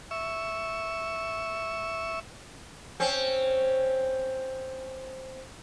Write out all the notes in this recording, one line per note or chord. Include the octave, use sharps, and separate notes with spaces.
E5 C#6
C4 C#4